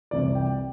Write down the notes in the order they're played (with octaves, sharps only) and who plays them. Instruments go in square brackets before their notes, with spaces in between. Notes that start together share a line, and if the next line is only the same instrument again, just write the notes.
[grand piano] C2 C3 E3 D5
G5